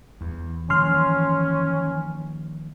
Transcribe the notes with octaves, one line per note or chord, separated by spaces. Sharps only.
E2 E3
D#3 F3 A#3 C#4 C6 F6